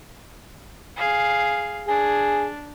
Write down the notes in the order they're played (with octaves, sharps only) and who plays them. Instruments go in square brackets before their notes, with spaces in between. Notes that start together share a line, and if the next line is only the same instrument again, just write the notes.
[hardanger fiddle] G#4 F5
[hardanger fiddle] D4 [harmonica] G#4